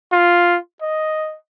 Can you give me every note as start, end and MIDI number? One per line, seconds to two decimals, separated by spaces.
0.12 0.58 65
0.82 1.36 75